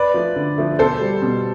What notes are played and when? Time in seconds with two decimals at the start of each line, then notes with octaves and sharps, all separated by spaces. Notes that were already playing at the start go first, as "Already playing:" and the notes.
Already playing: B4 D5
0.14 F3 A3
0.36 D3
0.58 F3 A3
0.79 B2 A4 C5
1.01 G3
1.22 B2